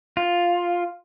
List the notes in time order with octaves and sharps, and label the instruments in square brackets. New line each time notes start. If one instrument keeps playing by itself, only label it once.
[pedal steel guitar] F4